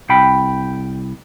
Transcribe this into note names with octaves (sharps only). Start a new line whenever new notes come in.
C2 G5 B5